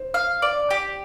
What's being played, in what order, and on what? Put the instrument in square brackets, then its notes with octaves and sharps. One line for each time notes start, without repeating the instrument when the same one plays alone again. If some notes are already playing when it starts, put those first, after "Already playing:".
Already playing: [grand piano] C5
[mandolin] F5
D5
G4